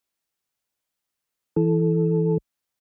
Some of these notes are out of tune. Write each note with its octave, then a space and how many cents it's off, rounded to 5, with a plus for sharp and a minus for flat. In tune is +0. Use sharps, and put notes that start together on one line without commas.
E3 +0 A4 -10